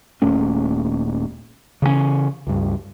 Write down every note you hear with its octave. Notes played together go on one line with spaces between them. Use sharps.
D#1 A#2 A3 C#4
C#3 E3 F#3 C#4
C#2 G2